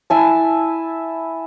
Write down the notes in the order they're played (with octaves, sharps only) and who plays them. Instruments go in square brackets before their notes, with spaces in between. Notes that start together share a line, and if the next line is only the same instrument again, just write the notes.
[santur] E4 G#5 A5